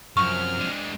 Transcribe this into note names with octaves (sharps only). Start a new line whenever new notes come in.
F#2 C3 F3 F#3 C#6 F6
G#3 D4